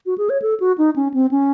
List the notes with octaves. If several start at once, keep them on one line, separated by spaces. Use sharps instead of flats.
F#4
G#4
C#5
A4
F#4
D#4
C#4
C4
C#4